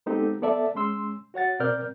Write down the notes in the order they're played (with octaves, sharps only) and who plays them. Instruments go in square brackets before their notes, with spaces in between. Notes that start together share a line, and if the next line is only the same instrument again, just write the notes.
[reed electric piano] G#3 B3 C4 D#4 G4 A4
B3 A4 D5 E5 A5
G#3 C#4 C6 E6
F#4 C#5 F#5 A6
B2 C4 A#4 D5 F6 G6